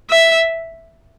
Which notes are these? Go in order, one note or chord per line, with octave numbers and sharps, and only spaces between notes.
E5